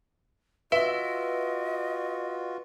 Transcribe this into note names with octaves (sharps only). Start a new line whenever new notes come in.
F4 F#4 B4 D#5 E5